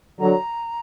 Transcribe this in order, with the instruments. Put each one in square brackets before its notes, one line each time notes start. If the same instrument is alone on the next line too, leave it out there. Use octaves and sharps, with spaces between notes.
[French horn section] D3 F#3 [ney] A#5